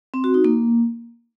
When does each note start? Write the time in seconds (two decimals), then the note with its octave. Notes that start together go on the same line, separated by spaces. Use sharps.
0.14 C4
0.24 F#4
0.34 D#4
0.44 A#3